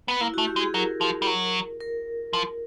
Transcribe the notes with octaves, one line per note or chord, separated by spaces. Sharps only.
B3
A#3 E4
F#4
A3
G4
G#3
G#4
F#3 A#4
F3
G3
F#3
A#4
F3